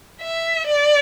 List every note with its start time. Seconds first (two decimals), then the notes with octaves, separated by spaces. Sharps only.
0.22 E5
0.67 D5